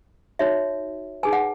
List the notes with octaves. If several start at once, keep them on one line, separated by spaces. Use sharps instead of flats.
D#4 F#4 C#5 E5
D#4 G#4 B4 G#5
F#5